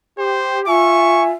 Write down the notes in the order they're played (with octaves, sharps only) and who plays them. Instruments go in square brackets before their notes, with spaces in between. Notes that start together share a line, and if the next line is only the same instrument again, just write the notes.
[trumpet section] G4 [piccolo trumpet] C5
[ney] F4 [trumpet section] E5 G#5 [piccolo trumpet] C#6